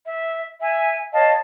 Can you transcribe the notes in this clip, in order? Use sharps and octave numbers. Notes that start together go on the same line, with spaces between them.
E5
E5 G#5
C#5 D#5 F5 A5